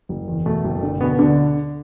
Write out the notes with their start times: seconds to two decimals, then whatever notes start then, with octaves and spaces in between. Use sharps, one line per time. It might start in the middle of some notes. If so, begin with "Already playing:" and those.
0.09 F#1
0.27 E2
0.46 B2 A3
0.64 F#1
0.83 D3
1.01 B2 D3 B3
1.19 D2 D3 D4